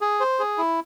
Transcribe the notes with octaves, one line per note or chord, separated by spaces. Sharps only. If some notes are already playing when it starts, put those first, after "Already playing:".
G#4
C5
G#4
E4